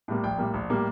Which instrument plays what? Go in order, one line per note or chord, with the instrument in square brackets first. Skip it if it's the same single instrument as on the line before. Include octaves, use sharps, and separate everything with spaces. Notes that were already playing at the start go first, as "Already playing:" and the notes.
[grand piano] A2 G3 A#3
A#1 G5
A2 G3 A#3
A#1
A2 G3 A#3